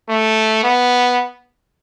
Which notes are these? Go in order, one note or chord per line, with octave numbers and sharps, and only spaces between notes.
A3
B3